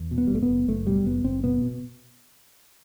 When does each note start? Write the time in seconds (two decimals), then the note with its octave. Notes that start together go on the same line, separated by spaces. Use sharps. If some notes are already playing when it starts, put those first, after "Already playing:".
Already playing: E2
0.11 B2
0.18 B3
0.27 G3
0.30 F#1 A3
0.42 B3
0.49 F#1
0.68 F#1 A3
0.86 B2 G3
1.05 F#1 B3
1.24 F#1 C4
1.43 B2 B3
1.62 B2